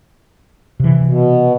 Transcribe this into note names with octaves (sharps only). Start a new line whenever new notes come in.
C3 E3
B2